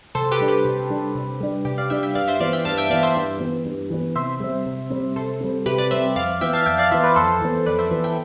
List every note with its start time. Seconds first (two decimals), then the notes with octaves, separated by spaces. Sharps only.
0.15 C3 A4 C5
0.31 G4 B4
0.40 G3 D4
0.48 G4 B4
0.65 C3
0.90 G3 D4
1.15 C3
1.40 G3 D4
1.65 C3 G4
1.78 D5 F5
1.90 G3 D4 E5 G5
2.03 E5 G5
2.15 G2 D5 F5
2.28 C5 E5
2.40 E3 B3 D5 F5
2.53 E5 G5
2.65 G2 F5 A5
2.77 E5 G5
2.90 E3 B3 D5 F5
3.03 C5 E5
3.16 G2
3.40 E3 B3
3.66 G2
3.90 E3 B3
4.16 C3 C5 E5
4.40 G3 C4
4.66 C3
4.90 G3 C4
5.16 C3 A4 C5
5.41 G3 C4
5.66 C3 G4 B4
5.78 B4 D5
5.91 G3 C4 C5 E5
6.16 F2 D5 F5
6.41 E3 B3 E5 G5
6.53 F5 A5
6.66 F2 E5 G5
6.78 D5 F5
6.91 E3 B3 C5 E5
7.04 B4 D5
7.16 F2 A4 C5
7.41 E3 B3
7.66 F2 B4 D5
7.79 C5 E5
7.91 E3 B3
8.04 E5 G5